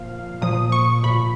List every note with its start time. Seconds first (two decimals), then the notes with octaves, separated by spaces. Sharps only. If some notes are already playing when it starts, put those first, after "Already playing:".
Already playing: A#2 F3 F5
0.42 A#2 F3 D#6
0.72 C#6
1.03 A#2 F3 B5